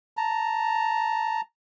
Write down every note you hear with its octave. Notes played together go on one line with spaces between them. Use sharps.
A5 A#5